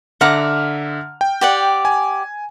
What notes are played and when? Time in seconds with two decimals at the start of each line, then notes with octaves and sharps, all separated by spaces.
0.21 D3 E5 F#5 A#5 D6 F6
1.21 G5
1.41 G4 D5 F#5
1.85 G#5